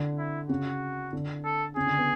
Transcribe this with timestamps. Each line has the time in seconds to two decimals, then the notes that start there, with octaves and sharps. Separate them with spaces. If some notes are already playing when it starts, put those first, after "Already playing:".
Already playing: D3
0.18 E4
0.49 C#3 F#4
1.13 D3
1.45 A4
1.76 C#3 G#4
1.87 D3
1.98 B3